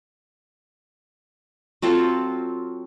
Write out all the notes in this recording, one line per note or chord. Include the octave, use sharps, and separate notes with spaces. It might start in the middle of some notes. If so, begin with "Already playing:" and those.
F#3 C4 F4 A4